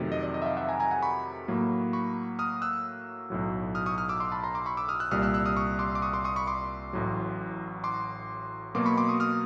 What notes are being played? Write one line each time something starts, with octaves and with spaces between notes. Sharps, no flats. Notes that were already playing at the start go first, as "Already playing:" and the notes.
Already playing: F2 C3 D#3 F#3 A3
D#5
D5
D#5
E5
D#5 F5
E5 F#5
G#5 A#5
G#5 A#5
F#5 G#5
B5 C#6
A2 F#3 A#3
B5 C#6
D#6 F6
E6 F#6
B1 A2 F#3
D#6 F6
C#6 D#6
D#6 F6
D6 E6
C6 D6
A5 B5
A#5 C6
C6 D6
B5 C#6
D6 E6
D#6 F6
E6 F#6
C2 A#2 G3 D#6 F6
E6 F#6
E6 F#6
D#6 F6
C#6 D#6
C6 D6
D6
C#6 D#6
C6 D6
C#6 D#6
B5 C#6
C6 D6
A1 A2 F#3
C6 D6
B2 F#3 A#3 C6 D6
B5 C#6
C6 D6
C#6 D#6
D#6 F6